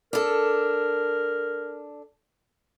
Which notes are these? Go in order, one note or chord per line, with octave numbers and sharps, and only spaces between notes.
D4 A4 A#4